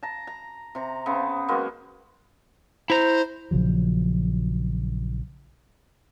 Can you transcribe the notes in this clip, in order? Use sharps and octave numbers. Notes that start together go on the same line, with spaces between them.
A5 A#5
A#5
C3 A#5
C#3 B3 C4
F#3 G#3 A#3 B3
E4 C5 A#5
A#1 C#3 F3 F#3